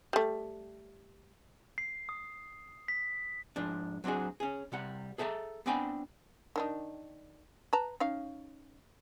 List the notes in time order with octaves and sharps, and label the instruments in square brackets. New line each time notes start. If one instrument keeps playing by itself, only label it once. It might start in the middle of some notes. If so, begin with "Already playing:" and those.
[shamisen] G3 A3
[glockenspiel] C7
D#6
B6
[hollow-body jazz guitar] G#2 F3 D4
F#3 C4 D4 F#4 G#4
C#4 G#4
C3 G3 F#5
G#4 A4 E5 F#5 A#5
B3 C4 D4 G5 G#5 B5
[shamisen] D#3 D4 D#4
B4 A5 A#5
C#4 D#4 F5